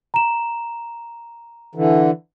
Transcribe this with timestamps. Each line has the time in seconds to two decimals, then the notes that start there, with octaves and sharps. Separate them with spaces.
0.14 A#5 E7
1.75 D3 E3